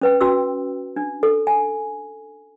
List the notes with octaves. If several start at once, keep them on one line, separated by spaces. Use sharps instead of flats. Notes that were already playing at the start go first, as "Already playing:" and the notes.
C#4 B4 G5
C#4 F#4 E6
D4
A4
G#5